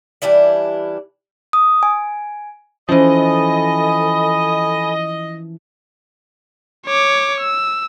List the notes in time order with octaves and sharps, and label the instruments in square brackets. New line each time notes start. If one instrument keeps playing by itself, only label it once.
[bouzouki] E3 G3 D4 E4
[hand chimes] D#6
G#5
[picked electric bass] E3 F3 [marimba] C#4 C5 [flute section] A4 G#5 B5 [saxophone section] D#5
[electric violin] C#5 D6
E6